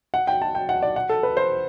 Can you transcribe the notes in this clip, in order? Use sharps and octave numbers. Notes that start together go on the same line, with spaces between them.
F#5
G5
A5
G5
F#5
D5
F#5
A4
B4
C5